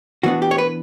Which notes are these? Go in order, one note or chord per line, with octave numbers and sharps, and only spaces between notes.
E3 B3 D4 F#4
G4
C#5
B4